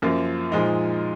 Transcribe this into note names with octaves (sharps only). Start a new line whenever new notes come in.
F#2 F3 A#3 F4
A#2 F3 G#3 D#4